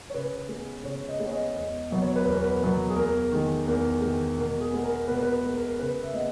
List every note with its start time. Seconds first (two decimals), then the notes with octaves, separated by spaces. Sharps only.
0.10 C#5
0.14 C#3 B4
0.49 G#3 B3
0.84 C#3 C#5
1.09 D#5
1.20 G#3 B3
1.27 C#5
1.32 D#5
1.56 E2 D#5
1.91 B2 F#3 B3
2.02 C#5
2.16 B4
2.25 E2 A#4
2.42 B4
2.61 B2 F#3 B3
2.90 G#4
2.96 E2 A#4
3.32 D#3 G#3
3.66 E2 A#4
4.02 D#3 G#3
4.38 B2 A#4
4.61 G#4
4.72 G#3 B3
4.84 A#4
5.08 B2 B4
5.16 A#4
5.23 B4
5.32 A#4
5.43 G#3 B3
5.56 A#4
5.79 C#3 B4
6.03 E5
6.14 G#3 B3 D#5